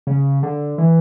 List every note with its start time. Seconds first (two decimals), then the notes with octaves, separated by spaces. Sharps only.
0.07 C#3
0.43 D3
0.78 E3